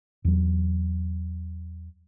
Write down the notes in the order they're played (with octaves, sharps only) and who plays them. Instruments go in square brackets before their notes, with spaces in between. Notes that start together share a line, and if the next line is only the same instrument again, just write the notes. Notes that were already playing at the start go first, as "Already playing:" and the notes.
[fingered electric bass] E2 F#3